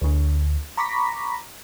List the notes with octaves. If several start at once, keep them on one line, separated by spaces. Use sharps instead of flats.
D2 D3
A#5 B5 C#6 D6 A#6 B6